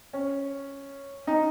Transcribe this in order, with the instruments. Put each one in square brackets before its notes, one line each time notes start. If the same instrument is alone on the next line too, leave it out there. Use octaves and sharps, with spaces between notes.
[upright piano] C#4
D#4